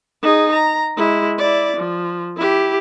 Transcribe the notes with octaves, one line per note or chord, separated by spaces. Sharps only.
D#4 G#4
A#5
G#3 E4
E4 D5
F3
E4 G4